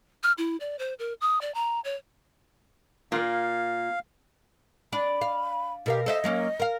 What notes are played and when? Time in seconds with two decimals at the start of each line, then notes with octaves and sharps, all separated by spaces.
0.23 F6
0.38 E4
0.60 D5
0.79 C5
0.99 A#4
1.21 D#6
1.41 D5
1.55 A#5
1.85 C#5
3.12 A#2 A#3 F5
4.93 D4 B5
5.21 F5
5.86 B2 G4 A#4 F5
6.06 A4 C5 D#5 E5
6.24 F#3 A#3 C#4
6.60 A#4 F5